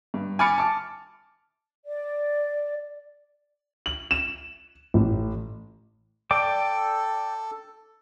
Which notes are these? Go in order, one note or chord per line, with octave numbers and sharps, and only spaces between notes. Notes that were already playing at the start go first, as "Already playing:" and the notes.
G2
G#5 B5 D6 F6 A6 C#7
A5 D6
D5
F#7
E7
A1
A4 D5 G5 D6